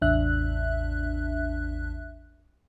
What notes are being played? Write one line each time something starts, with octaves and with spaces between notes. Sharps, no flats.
A1 E2 D4 E5 F#6